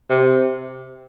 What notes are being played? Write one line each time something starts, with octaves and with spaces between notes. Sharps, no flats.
C3